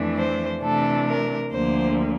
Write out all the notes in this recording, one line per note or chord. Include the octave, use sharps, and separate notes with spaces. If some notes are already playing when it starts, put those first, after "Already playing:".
Already playing: F2 E3 A3 D4
C5
C3 E3 A3 D4 A4
A#4
D2 D3 F3 A#3 C5